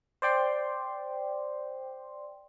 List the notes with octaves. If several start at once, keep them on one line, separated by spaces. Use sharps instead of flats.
C5 D5 G5 C6